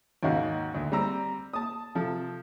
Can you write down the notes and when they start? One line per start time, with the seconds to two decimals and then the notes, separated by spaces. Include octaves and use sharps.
0.23 D#2 G#2 C#3 D#4 F#4 F5
0.75 D2
0.92 G3 C4 A#5 E6
1.53 A5 D#6
1.95 C3 F3 A4